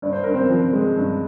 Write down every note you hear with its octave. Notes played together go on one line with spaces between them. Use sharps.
G2 D5
C5
G2 A#4
C4 C5
F3
G#3
G2